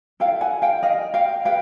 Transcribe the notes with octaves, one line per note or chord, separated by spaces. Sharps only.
A4 F5 G5
E4
F#5 G#5
F5 G5
D#5 F5
F5 G5
G#4 B4 F5 G5